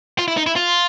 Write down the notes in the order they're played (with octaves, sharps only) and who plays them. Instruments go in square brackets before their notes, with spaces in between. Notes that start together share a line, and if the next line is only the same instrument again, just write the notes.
[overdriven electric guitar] F4
E4
D#4
E4
F4